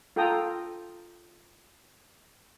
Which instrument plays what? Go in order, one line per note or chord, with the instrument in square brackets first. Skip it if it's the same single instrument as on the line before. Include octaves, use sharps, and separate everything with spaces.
[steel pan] F4 A4 G5 A#5 D#6